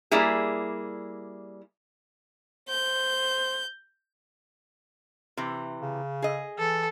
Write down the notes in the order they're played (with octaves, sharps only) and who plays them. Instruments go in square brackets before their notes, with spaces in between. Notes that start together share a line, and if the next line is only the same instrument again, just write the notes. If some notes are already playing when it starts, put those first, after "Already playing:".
[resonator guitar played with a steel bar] G3 A#3 E4 G#4
[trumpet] C5 [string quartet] G6
[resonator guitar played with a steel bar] C3 E3
[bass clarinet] C#3
[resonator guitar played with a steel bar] G#4 D#5
[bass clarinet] E3 [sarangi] A4